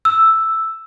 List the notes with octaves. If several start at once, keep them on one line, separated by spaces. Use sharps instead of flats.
E6